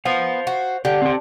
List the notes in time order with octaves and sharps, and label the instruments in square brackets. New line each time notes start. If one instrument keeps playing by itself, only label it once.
[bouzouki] B3 [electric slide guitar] C5 F5
[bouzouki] F#4
[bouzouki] D3 [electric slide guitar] G4
[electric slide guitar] C4 G4